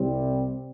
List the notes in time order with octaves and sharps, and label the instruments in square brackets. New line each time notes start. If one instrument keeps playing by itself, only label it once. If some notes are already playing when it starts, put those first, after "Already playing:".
Already playing: [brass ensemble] C2 C3 G3 C4